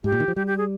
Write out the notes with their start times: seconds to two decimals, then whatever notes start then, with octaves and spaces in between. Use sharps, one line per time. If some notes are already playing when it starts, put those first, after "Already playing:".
0.04 G#2 G4
0.12 A#2
0.20 D#3
0.28 F3
0.36 G3 G4
0.47 G4
0.58 G#4